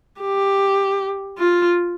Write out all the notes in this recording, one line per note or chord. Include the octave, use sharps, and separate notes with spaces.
G4
F4